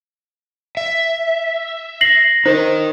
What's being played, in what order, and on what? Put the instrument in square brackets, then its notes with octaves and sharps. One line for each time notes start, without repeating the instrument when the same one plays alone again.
[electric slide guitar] E5
[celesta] A#6 C7 F#7
[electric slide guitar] D#4 A#4 [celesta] C5